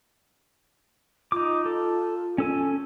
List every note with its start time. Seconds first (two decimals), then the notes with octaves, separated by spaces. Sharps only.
1.32 D#4 F4 D6
1.65 A4
2.38 C#4 A4 G#5